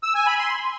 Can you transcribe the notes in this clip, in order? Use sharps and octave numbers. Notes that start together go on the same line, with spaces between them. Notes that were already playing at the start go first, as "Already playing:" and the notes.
E6
G#5
B5
C6